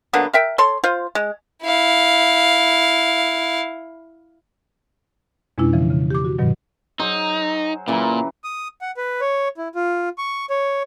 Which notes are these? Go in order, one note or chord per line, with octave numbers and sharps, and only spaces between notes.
D3 F#3 A#3 B3
A#4 E5 G5
A4 C#5 C6
F4 C5
G#3
E4 F5
F2 B2 G#3 C#4 D4 E4
C#3 E3 F3
C#3
G4 D6
F#4
G2 B2 D#3 F#3
F#3 D#4 G#4 C5
A#2 C#3 E3 F#3
D#6
F#5
B4
C#5
E4
F4
C#6
C#5